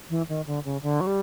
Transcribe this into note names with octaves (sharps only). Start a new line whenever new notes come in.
E3
D#3
D3
C#3
D3
F#3
G3